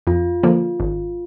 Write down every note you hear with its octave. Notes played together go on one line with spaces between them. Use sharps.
F2 F4
D3 F3 A#3
G#1